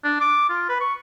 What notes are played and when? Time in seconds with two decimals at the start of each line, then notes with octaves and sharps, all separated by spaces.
0.04 D4
0.21 D6
0.49 F4
0.69 B4
0.81 C#6